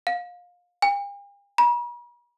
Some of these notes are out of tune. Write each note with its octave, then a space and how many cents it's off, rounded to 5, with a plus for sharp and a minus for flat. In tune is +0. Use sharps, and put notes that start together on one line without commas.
F5 +25
G5 +45
B5 -45